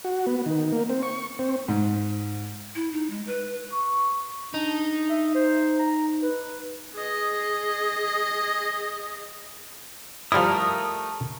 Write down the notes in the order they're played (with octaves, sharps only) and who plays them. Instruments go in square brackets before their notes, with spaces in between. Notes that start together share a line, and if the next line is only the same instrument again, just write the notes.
[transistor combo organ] F#4
B3
D#3
A#3
C4
C#6
C4
[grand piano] G#2
[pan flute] E4
D#4
G#3
B4
[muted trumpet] C#6
[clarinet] D4 [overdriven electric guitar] D#4
[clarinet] E5
C5
A#5
B4
[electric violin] G#4 D#5
[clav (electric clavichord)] F3 G3 E4 [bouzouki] A3 A#4 [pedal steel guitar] D#6